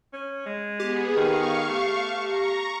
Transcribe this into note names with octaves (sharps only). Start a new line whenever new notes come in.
C#4
G#3
B3 G4 G#4
D#3 F5 C#6
A3
A#5 C#6